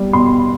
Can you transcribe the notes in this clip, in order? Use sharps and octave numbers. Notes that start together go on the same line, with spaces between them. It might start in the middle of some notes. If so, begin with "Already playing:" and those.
Already playing: G3
B2 C6